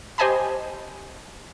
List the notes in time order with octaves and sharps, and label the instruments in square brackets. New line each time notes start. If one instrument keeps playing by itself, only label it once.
[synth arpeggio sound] G4 C5 D#5 G#5 A5 B5